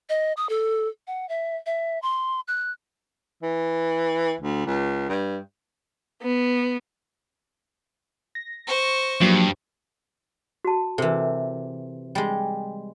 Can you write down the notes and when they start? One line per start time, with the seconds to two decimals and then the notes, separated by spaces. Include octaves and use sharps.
0.09 D#5
0.37 D#6
0.49 A4
1.07 F#5
1.29 E5
1.66 E5
2.02 C6
2.48 F#6
3.42 E3
4.40 D2
4.66 C#2
5.09 G2
6.22 B3
8.35 A#6
8.67 C5 C#6
9.21 G2 F3 F#3 A#3
10.65 F#4 A5
10.98 C3 E3 A4 A#4
12.15 G3 G#3